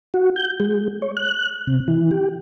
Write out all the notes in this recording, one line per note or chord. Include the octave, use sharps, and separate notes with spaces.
F#4
G6
G#3
C#5
F#6
C3
E3
G4